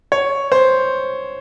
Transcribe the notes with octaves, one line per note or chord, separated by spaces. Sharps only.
C#5
C5